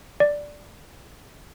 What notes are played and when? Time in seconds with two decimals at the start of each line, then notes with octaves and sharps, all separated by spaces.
0.20 D5